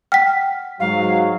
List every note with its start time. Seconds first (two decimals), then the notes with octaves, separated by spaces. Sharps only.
0.12 F#5 G5 F6 B6
0.80 G#2 F#3 F5